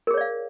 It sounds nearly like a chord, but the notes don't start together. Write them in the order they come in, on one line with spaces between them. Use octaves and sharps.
A#4 G#4 C#5 D5 F5